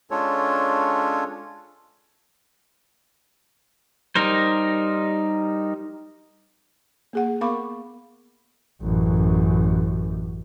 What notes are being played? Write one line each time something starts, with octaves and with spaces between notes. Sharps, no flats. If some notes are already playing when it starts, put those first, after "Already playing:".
G#3 C#4 D4 F4 A4 C#5
G3 D#4 A#4 C5
A#3 G#4 F#5
B3 A#4 F5 B5 C#6 D6
A1 F#2